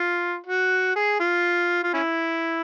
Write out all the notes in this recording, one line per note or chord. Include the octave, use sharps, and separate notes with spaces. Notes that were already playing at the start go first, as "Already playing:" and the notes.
Already playing: F4
F#4
G#4
F4
F4
C#4 E4